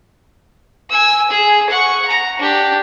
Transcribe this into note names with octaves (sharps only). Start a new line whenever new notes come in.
G#5 E6
G#4
F#5 C#6
A#5
D4 G4